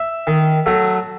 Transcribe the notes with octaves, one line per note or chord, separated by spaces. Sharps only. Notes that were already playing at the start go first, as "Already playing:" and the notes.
Already playing: E5
D#3
F#3 A3